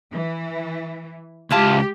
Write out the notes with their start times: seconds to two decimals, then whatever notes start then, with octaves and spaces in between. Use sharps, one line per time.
0.12 E3
1.51 C#2 G#3 E4 F4 G4 F5 A5